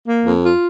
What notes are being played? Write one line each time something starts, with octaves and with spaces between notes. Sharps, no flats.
A#3
F2
F4